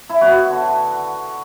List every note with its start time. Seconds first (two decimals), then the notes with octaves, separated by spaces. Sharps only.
0.10 E4
0.21 B3 F#4
0.50 D3